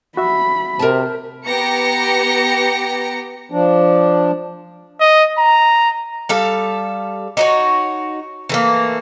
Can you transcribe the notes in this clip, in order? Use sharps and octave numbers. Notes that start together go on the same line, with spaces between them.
F#4 E5 B5
C3 A#4 C5 A5
B3 G4 A#5 A#6 C#7
F3 D4
D#5
A#5
G3 A4 F5
D#4 F#4 C#5
E3 A3 A#3